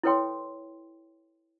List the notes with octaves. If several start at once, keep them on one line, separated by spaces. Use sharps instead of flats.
E4 A4 B4 C#5 G5 C6